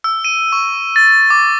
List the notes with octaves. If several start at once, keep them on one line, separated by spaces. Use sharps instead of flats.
E6
D#7
C#6
A6
D6